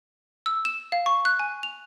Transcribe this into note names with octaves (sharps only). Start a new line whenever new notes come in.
E6
E7
F5
C#6
F#6
G#5
F7